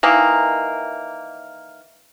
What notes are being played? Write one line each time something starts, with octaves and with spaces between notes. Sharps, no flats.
D#3 E3 A#3